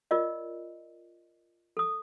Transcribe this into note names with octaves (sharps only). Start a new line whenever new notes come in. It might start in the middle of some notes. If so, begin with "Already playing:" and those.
F4 A#4 D5 D#5
A4 D#6